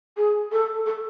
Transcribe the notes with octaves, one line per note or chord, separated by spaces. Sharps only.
G#4
A4
A4